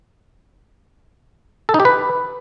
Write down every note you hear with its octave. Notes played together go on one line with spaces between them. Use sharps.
A4
D#4
G4
B4